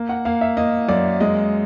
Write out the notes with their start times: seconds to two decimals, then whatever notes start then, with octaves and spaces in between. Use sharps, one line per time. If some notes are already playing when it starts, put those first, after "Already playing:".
Already playing: A#3
0.09 F#5
0.25 A#3 F5
0.41 E5
0.57 A#3 D#5
0.89 F#2 D5
1.20 G#3 D#5